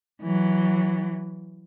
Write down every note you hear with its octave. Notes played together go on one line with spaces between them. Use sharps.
E3 F#3